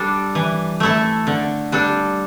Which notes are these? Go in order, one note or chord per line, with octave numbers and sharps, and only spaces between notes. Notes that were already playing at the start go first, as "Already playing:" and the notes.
Already playing: G3 D4 A4
E3
A3 E4 A4
D3
G3 D4 A4